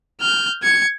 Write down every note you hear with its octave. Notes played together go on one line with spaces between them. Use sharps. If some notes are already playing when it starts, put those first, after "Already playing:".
F6 G6
G#6 C#7